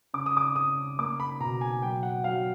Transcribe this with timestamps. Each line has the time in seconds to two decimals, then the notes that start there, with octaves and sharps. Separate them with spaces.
0.14 C#3 D6
0.26 D#6
0.37 D6
0.56 C#3 D#6
0.99 A#3 D6
1.20 B5
1.40 B2 A#5
1.61 G#5
1.82 F#3 G5
2.03 F#5
2.24 F#3 F5